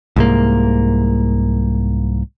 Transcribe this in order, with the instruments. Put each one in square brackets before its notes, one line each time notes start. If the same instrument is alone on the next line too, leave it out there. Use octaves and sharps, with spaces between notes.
[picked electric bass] C2 G#2 A#3